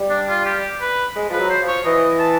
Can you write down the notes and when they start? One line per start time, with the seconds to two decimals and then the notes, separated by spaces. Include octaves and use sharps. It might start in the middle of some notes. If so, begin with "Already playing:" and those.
Already playing: G3
0.10 D4
0.29 F4
0.46 G4
0.81 B4
1.16 G#3
1.29 F3 B4
1.39 F#3
1.50 C5
1.62 F3
1.68 C#5
1.85 E3 D#5
2.19 A5